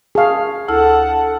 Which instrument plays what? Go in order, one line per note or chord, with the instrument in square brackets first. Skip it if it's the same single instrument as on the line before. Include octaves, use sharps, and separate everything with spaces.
[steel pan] G#4 F5 [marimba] A5 C#6
[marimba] D2 E4 F6 [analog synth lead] A4 [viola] F#5 A5